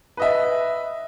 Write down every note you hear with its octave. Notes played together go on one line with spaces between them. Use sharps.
B4 D#5 E5